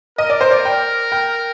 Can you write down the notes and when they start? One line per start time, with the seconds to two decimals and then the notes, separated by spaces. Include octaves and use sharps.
0.18 A#4 D#5
0.30 D5
0.41 C5
0.51 D5
0.65 G5
1.12 G5